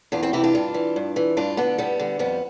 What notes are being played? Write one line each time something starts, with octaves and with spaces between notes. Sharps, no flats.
E2 D4 F4
C4 E4
C3 E3 E4 G4
D4 F4
G2
E3
G2
E3
G2 D4 F4
D3 B3 D4
G2 G3 B3
D3
F2 G3 B3